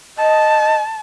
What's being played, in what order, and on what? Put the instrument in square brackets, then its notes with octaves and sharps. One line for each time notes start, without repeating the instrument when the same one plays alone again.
[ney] D#5 [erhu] A5